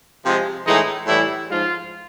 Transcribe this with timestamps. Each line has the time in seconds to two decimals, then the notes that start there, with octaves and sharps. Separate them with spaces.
0.24 C3 F3 G#3
0.65 A2 E3 G#3 D#4
1.06 A2 E3 G3 E4
1.49 G#2 F3 G#3 F4